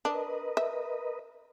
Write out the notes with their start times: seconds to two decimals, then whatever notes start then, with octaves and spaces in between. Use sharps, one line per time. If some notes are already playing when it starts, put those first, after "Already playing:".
0.05 D4 A#4 B4 D#5
0.57 E5